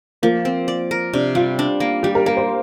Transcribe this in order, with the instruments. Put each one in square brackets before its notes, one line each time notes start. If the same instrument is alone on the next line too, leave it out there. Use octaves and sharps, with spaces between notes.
[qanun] F3 [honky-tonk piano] A#3
[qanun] C4
D5
A#4
[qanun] C3 [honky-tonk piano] D4
[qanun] G3 [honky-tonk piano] F4
[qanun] D4
A#3
[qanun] G3 [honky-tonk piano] G4
[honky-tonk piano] A#4
[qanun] A#3 [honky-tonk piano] A#4
[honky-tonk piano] C5